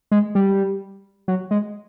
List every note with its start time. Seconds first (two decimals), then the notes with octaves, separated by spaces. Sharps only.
0.11 G#3
0.35 G3
1.28 F#3
1.51 G#3